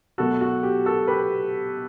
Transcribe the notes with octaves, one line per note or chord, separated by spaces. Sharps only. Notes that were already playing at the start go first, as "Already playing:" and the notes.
B2 F#3 A3 F#4 A4
F#4
G4
F#4 A4
G4 B4